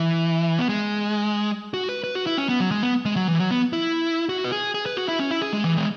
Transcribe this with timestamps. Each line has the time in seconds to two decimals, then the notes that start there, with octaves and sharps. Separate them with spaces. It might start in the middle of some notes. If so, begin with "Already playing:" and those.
Already playing: E3
0.59 B3
0.69 G#3
1.74 F#4
1.89 B4
2.04 B4
2.15 F#4
2.26 E4
2.38 C#4
2.49 B3
2.60 F#3
2.71 G#3
2.83 B3
3.05 G#3
3.16 F#3
3.28 E3
3.39 F#3
3.51 B3
3.73 E4
4.29 F#4
4.44 B4
4.52 G#4
4.74 G#4
4.86 B4
4.97 F#4
5.08 E4
5.19 C#4
5.31 E4
5.42 G#4
5.53 G#3
5.64 E3
5.77 G#3